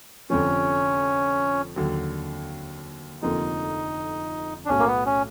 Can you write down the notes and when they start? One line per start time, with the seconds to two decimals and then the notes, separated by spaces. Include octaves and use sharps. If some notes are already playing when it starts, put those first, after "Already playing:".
0.30 F1 F2 D3 F3 C#4
1.76 D#2 D3 F#3
3.22 F1 F2 D3 F3 A#3 D#4
4.65 D4
4.69 B1 A2 F#3 C#4
4.79 A#3
4.87 B3
5.06 C#4